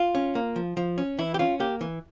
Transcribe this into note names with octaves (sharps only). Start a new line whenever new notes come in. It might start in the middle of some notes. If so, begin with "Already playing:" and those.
Already playing: F4
C#4
A#3
F3
F3
C#4
E3 E4
G4
C#4 F4
A#3 G4
E3